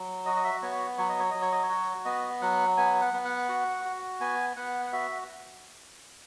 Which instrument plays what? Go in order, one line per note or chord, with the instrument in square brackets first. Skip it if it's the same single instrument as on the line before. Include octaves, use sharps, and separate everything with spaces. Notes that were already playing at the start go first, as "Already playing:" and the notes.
Already playing: [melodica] F#3
F#4 D#5
D#5
E5
B3 C#5
F#3 C#5
D#5
C#5
F#3 D#5
C#5
D#5
C#5
F#4
B3 D#5
F#3 F#5
B3 G#5
F#5
B3
F#5
F#4
F#4
B3 G#5
B3 F#5
F#5
F#4 E5